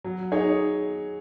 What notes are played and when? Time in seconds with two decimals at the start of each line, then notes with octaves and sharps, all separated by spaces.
0.04 F#3
0.32 D#4 G#4 C#5